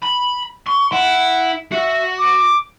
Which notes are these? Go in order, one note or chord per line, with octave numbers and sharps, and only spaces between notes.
B5
C6 C#6
E4 F#5
F#4 E5
D6